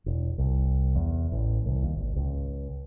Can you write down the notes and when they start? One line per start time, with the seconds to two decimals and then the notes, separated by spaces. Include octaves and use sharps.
0.06 E1
0.38 C2
0.96 E2
1.32 A1
1.66 C2
1.83 D#2
1.97 G#1
2.16 C#2